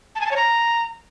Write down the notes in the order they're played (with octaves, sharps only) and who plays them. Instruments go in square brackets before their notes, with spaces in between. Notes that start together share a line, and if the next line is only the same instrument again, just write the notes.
[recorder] A5
G#5
A5
C#5
A#5